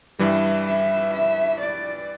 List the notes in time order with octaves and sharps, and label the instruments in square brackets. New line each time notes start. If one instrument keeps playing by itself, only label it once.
[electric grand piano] G2 E3 G3 [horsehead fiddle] E5
[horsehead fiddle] E5
E5
D5